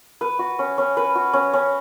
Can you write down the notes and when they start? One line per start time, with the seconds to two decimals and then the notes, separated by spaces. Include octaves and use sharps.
0.21 B4
0.39 F#4
0.59 C#4
0.78 C#4
0.97 B4
1.15 F#4
1.33 C#4
1.53 C#4